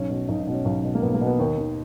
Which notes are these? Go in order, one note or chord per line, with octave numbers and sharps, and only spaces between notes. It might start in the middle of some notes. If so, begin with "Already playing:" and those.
Already playing: B1 C#4
B2
B1 D#4
D#4
B2
C#4
B1
B2
A#3
B1 B3
A#3
B2
B3
D#2 D#4
D#3